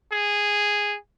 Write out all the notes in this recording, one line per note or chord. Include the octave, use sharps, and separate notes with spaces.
G#4